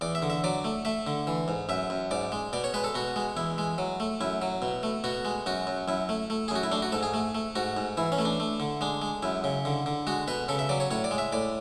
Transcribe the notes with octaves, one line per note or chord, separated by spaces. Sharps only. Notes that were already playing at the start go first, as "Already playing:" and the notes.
E2 D5
E5
D3
E5
F#3 D5
A3
A3 E5
D3
E3
G#2
F#2 E5
F#2
G#2 D5
G#3
B2 D5
C#5
G#3 B4
A4
B2 F#4
G#3
E2 E4
G#3
F#3
A3
F#2 E4
F#3
B2
A3
B2 F#4
G#3
F#2 F#4
F#2
F#2 E4
A3
A3
G#4
F#2 F#4
E4
A3 D4
F#4
G#2 A4
G#4
A3
A3
G#2 F#4
G#2
E3 E4
C#4
A3
D4
A3
D3
G#3 D4
G#3
F#2 E4
C#3
D3
D3
G#3 F#4
B2 B4
C#3 A4
E5
F#3 D5
C#5
A2 C#5
D5
G#3
E5
A2 D5